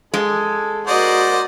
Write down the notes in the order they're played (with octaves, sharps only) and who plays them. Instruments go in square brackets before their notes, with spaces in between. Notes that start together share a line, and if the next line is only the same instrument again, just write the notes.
[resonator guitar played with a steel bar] G#3 [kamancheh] A4
[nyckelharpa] F#4 D#5 [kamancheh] A#4 F#5 [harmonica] C5 D5